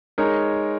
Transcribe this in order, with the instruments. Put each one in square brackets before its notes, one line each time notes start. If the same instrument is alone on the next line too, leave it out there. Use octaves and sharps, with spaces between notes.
[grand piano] G#3 D#4 A#4 C#5